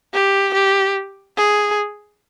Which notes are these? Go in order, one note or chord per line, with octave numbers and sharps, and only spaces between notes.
G4
G4
G#4